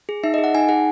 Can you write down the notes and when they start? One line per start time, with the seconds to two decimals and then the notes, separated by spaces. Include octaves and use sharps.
0.09 G#4
0.23 D#4 E5
0.34 G#4 D#5
0.44 F#5
0.55 D#4 G#5
0.69 G#4 F#5